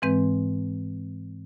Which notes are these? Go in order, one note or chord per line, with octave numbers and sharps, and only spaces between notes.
G#2 E3 G#3 C4 B4 G6